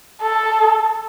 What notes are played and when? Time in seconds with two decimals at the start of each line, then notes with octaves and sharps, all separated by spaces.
0.22 A4